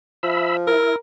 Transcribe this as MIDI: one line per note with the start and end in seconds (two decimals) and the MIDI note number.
0.23 0.72 53
0.23 0.57 76
0.23 0.57 83
0.67 0.96 64
0.67 0.95 70